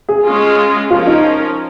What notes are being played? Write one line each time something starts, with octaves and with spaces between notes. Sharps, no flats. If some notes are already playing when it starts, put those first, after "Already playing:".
G#4
G#3 C#4 F4
F3 C#4 F4 A#4
D#4